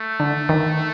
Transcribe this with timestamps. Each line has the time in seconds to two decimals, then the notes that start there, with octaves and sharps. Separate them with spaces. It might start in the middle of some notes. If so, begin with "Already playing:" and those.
Already playing: A3
0.20 D3
0.49 D#3